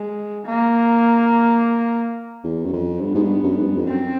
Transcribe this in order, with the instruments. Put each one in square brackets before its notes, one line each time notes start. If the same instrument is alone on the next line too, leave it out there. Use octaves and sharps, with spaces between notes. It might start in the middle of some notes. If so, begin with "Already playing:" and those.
Already playing: [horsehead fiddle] G#3
A#3
[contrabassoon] E2
F#2
F2
[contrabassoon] G2 [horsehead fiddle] B3
[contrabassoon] G#2
G2
F#2
G#2
G2
F2
[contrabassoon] F#2 [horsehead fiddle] C4